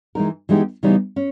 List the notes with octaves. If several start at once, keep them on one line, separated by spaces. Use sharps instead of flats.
E3 G#3 D#4 A#4
E3 G#3 B3 D#4 G4
C#3 E3 G3 B3 D#4
C#4